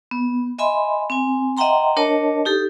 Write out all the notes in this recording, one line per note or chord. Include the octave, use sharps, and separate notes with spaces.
B3
D#5 E5 G#5 B5 C6
C4 G#5
D#5 E5 F#5 G5 A#5 C6
D4 A#4 C#5 D#5 A5
D#4 G4 A4